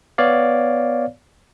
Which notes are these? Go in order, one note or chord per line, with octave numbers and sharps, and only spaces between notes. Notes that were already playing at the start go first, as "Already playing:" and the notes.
B3 C#5 D5 F5